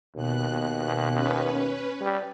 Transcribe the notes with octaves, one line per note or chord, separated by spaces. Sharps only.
D#2 B2 F#6
C#4 B4
G3